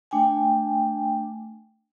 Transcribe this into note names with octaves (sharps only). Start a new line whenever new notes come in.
A3 D4 G5 G#5